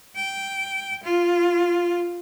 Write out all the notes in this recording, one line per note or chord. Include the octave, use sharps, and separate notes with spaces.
G5
F4